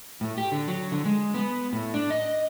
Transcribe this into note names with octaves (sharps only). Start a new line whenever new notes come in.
A2
G4
D3
F#3
D3
G#3
B3
A2
D4
D#5